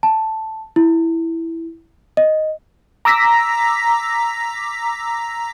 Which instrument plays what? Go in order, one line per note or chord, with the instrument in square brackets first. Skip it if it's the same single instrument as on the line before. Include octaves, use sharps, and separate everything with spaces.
[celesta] A5
E4
D#5
[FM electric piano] A#5 D6 E6 A#6 B6